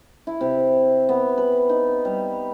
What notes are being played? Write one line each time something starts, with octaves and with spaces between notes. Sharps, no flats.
E4
C3
B3
B4
D#4
G3